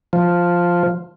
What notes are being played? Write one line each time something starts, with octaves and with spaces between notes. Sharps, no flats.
F3